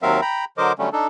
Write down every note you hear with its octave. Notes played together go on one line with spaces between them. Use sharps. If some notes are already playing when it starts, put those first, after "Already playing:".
D#2 F#3 C4 A#4 E5 F5
G5 A#5 B5
D3 F#3 A#4 C5 D#5 D6
D3 F#3 G3 A3 C#4
D4 D#4 A4